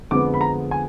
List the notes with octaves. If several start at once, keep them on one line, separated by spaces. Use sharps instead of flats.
F2 D3 G#3 B3 D6
B5
A#5
G#5